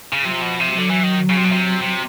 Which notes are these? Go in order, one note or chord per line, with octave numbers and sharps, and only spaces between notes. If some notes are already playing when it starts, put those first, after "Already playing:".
C#3
C3 F3
B2
C3
D3 F#3
E3
D#3
C#3
C3
B2
C3
C3